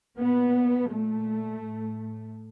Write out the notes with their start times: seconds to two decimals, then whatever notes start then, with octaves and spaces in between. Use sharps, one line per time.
0.18 A#2 B3
0.91 A#2 A3
1.64 A2